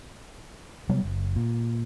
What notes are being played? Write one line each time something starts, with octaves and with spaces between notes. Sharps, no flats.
C3 F#3 G3 B3
F#1
A#2